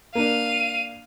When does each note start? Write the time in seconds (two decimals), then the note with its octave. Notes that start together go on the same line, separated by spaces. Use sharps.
0.15 A#3 D4 F5 D#7